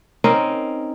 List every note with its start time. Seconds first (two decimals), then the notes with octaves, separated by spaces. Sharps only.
0.24 C4 C#4 D#4 A#4